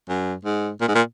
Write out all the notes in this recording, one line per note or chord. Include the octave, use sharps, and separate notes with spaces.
F#2
G#2
A#2
G#2
A#2